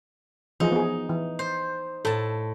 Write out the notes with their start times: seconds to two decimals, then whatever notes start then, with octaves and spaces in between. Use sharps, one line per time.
0.60 E3 F3 D#4 G#4
0.72 B3 G#4
1.09 E3
1.39 C5
2.05 A2 A4 A5